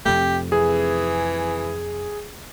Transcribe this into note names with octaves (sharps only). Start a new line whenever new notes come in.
F2 C3 A3 G4
E3 G#4